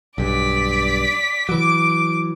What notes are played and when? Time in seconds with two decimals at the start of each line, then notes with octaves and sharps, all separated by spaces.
0.18 B1 G2 D5 B6
1.49 E3 F#3 D6